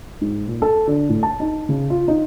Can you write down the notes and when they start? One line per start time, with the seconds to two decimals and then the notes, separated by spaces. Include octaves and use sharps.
0.21 G#2
0.47 A#2
0.62 A4
0.87 D3
1.09 A2
1.23 A5
1.40 D#4
1.69 C#3
1.90 F4
2.08 D#4